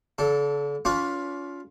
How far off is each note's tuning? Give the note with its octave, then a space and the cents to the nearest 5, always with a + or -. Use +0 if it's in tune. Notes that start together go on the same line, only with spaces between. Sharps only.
D3 -40 A4 +0
C#4 +45 F4 +10 B4 +0